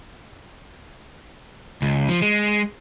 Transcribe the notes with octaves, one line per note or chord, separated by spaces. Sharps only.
C#2
F3
G#3